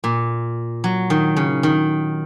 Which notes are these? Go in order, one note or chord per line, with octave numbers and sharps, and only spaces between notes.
A#2
F#3
D#3
C#3
D#3